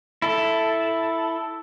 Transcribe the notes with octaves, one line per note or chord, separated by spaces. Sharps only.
E4 A4